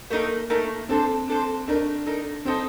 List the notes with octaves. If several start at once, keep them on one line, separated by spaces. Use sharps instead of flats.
A3 A#3 D#4 A#4
A3 D#4 A#4
C4 D4 A4 C5
D4 A4 C5
A3 D4 D#4 A#4
A3 D#4 A#4
C4 D#4 A4 C5 G5